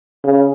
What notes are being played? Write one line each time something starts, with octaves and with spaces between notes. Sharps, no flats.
C#3